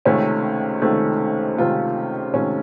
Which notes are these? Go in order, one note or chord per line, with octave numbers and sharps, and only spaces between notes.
C#2 C3 D#3 A3 C#4
C#2 C3 D#3 A3
C#2 C3 D#3 A3 F4
C#2 C3 D#3 A3 C#4